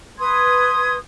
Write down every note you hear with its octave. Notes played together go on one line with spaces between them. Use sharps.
B4 C6 D#6 G#6